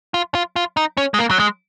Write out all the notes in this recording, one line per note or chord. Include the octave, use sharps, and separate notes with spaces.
F4
F4
F4
D#4
C#4
G#3
A#3
F#3
G#3